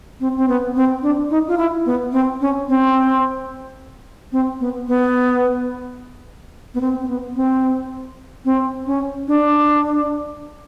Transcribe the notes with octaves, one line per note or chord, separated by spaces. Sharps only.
C4
C4
B3
C4
D4
D#4
F4
E4
B3
C4
C#4
C4
C4
B3
B3
B3
C4
C4
B3
C4
C4
C#4
D4